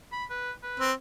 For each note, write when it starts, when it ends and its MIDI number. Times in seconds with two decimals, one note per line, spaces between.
0.12 0.25 83
0.30 0.51 71
0.63 0.89 71
0.80 0.93 60